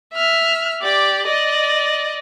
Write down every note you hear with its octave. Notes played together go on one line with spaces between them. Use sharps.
E5 F6
G4 D5
D5 D#5